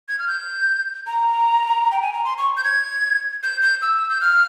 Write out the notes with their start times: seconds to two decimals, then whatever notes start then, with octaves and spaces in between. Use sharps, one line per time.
0.08 G#6
0.19 F6
0.28 G6
1.07 A#5
1.91 G5
2.02 G#5
2.13 A#5
2.25 C6
2.38 C#6
2.57 G6
2.64 G#6
3.43 G6
3.62 G6
3.82 E6
4.09 G6
4.21 F6